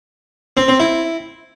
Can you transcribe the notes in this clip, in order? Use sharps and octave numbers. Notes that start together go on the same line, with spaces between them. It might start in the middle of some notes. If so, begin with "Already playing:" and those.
C4
C4
E4